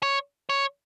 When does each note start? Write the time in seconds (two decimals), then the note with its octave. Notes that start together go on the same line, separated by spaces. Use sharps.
0.03 C#5
0.49 C#5